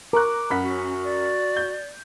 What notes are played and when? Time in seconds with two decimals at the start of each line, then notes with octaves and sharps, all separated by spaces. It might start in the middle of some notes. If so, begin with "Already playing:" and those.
0.13 A#4 A#5 C#6 D6 F#6
0.50 F#2 F#5 B5 B6
0.65 C#4 F#4
1.03 D5
1.57 G6